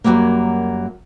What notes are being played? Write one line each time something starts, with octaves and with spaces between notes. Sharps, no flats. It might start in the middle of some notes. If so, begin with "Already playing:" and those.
F#2 A2 F#3 G3 A#3